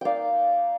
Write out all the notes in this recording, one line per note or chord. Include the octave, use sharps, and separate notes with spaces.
A#3 D#4 D5 F5 G5